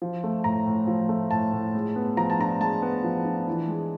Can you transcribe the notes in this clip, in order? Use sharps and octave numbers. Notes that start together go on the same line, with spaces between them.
F3
A3
A2 A#5
A2
F3
A3
A2 A5
A2
G#3
B3
F3 A#5
A5
D4 A#5
G#3 A5
B3
F3
D4
E3
G#3